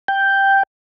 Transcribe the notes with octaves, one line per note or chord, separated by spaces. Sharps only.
G5